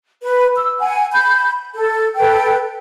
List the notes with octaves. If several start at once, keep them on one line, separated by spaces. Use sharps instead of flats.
B4
E6
F#5 G#5
B5 G6
A4
A4 B4 G5